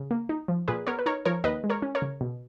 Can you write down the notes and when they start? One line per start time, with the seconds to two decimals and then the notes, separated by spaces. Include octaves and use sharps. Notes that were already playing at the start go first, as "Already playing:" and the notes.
Already playing: C#3
0.11 A#3
0.29 D#4
0.48 F3
0.68 A#2 G#4 B4
0.87 B3 A#4 C#5
0.99 B4
1.06 D#4 A#4 C#5
1.25 F3 A#4 C#5
1.44 D#2 B4 D#5
1.64 G#3
1.70 A#4 C#5
1.82 C#4
1.95 A#4 C#5
2.02 C#3
2.21 B2